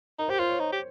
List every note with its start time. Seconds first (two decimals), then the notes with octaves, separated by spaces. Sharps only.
0.19 D#4 A#4
0.28 G4 C5
0.39 F4 C5
0.49 C#5
0.60 D#4
0.72 G4